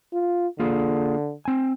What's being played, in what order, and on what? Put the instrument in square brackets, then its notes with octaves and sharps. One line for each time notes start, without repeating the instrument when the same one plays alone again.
[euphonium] F4
[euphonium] D3 [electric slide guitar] A#3 F4 G#4
[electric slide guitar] C4 G#5